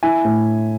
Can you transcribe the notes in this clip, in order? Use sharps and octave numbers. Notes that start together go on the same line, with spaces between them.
E4 G#5
A2